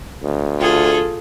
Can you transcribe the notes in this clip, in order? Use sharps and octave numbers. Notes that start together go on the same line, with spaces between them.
D2
F4 G#4 A4